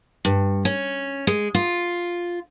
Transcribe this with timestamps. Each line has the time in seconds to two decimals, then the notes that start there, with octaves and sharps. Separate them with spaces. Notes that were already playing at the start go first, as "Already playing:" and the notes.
0.25 G2
0.65 C#4
1.27 G#3
1.55 F4